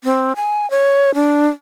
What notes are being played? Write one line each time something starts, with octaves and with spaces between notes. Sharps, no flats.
C4
G#5
C#5
D4